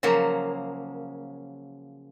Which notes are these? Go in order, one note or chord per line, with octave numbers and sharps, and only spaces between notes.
C#3 F3 F#3 A#3